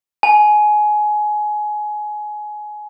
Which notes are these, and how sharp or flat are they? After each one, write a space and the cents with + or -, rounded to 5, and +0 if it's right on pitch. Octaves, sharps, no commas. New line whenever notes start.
G#5 +20